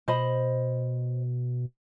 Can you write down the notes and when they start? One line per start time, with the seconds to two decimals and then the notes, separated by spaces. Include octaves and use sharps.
0.08 B2 C5 D#5 B5